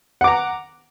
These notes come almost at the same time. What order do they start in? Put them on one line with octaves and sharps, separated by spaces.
F#5 D6 A#5